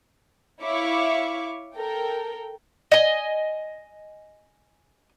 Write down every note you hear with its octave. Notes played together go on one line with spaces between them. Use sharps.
E4 C#5 E5 F5 C#6 D6
A4 A#4 G5
D#5 G#5